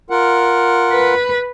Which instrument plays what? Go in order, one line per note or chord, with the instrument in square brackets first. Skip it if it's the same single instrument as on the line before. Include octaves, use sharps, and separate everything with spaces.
[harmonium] F4 A#4 F#5
[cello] B4